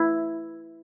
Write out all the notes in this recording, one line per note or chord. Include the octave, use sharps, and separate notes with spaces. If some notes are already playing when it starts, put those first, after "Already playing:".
Already playing: E4